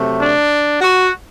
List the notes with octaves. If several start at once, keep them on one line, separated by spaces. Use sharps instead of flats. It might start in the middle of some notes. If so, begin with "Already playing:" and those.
Already playing: C3 F#3 A3
D4
F#4